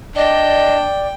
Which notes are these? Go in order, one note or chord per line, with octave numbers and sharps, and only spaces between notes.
D4 D5 D#5 G5